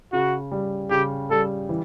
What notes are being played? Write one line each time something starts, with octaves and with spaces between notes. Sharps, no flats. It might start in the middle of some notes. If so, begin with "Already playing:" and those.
C#3 F#4
G3
C#3 G4
G3 A4
E3